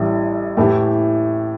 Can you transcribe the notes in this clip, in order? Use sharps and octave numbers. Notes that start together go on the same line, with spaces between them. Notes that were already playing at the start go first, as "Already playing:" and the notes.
Already playing: A1 A2 G3
A2 E3 A3 G4